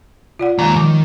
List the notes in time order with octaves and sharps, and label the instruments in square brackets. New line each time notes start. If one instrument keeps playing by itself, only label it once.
[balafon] F4 D5 F#5
[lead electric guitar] D#2 A#5 [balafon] F#3 G#3
[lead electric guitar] D#3 [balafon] F3 D6